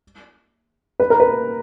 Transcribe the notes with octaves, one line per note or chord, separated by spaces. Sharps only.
B4
A#4
B4